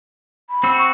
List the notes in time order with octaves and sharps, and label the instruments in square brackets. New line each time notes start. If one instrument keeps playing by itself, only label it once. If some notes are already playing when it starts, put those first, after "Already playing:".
[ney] B5
[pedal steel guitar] C4 F#4 E6
[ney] C#6